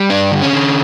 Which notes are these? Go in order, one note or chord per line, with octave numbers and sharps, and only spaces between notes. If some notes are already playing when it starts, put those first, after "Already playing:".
Already playing: G3
G2 D4
D3
C#4
D3